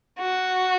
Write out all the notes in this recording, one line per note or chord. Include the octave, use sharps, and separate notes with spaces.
F#4